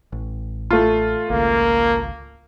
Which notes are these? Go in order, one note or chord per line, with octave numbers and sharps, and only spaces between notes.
A1
A3 F4
G#1 C#2 A#3